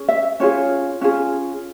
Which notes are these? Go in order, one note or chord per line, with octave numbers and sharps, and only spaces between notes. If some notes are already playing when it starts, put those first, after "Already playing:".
Already playing: C#4 G#4
E5
C#4 F4 G#4 C#5
C#4 F4 G#4